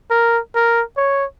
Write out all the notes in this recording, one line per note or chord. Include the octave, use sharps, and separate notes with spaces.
A#4
A#4
C#5